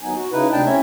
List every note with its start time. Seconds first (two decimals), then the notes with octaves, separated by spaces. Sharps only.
0.01 D#2 F#3 B3 D#4 G#5
0.15 F#4
0.33 C#3 D#4 E4 B4
0.52 D2 C3 D4 D#4 G5 A5
0.66 A3 C4 C#4 E4 C#5 E5